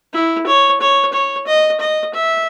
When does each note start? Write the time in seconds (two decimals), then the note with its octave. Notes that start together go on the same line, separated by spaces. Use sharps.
0.14 E4
0.47 C#5
0.81 C#5
1.13 C#5
1.47 D#5
1.80 D#5
2.14 E5